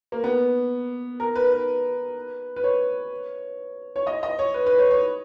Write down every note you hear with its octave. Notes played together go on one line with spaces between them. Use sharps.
A#3
B3
A#4
B4
B4
B4
C#5
C#5
D#5
D#5
C#5
B4
B4
C#5
C#5